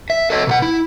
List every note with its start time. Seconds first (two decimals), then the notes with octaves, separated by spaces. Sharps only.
0.10 E5
0.30 A4 C#5 D#5
0.47 B2 A4 F#5
0.62 E4